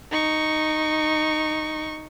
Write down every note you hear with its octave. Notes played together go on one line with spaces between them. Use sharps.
D#4 C#6